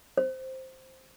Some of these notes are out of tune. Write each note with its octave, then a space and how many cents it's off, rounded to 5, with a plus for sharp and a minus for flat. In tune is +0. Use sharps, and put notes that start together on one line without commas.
C5 +0